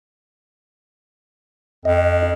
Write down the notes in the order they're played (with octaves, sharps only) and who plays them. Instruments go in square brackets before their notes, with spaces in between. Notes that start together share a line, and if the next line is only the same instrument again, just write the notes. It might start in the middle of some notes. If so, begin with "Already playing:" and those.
[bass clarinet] F2 [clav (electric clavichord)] D#5